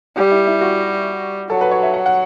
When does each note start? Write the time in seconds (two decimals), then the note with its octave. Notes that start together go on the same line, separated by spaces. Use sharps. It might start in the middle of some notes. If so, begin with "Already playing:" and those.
0.17 G3 G4
0.31 E4
0.47 E4
0.61 F#4
1.50 F#3 A4
1.61 B4
1.71 C#5
1.83 E5
1.94 F#5
2.06 F#5